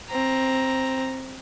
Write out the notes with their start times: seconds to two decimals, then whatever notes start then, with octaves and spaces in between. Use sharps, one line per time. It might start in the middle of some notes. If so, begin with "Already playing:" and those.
0.10 C4 A#5